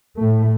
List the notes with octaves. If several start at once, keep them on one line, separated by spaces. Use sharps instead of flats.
A2 A3